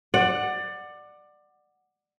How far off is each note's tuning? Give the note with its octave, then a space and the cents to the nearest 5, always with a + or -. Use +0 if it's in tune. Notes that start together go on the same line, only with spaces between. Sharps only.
D5 +20 F#5 +0